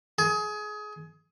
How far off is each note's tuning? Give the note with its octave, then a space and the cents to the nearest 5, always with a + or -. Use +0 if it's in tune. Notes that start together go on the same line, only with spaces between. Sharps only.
G#4 +25